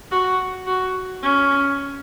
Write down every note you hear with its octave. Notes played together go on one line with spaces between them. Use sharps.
F#4
F#4
C#4